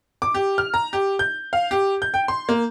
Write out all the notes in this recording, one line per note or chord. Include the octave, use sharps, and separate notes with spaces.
D6
G4
F6
A#5
G4
G6
F5
G4
G6
G5
C6
A#3